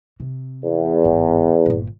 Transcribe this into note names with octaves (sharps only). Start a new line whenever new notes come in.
C3
E2
A1 G#2
G1 A#2